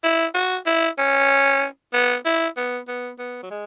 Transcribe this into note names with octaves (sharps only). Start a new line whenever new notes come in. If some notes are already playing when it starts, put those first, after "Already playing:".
E4
F#4
E4
C#4
B3
E4
B3
B3
B3
F#3
G#3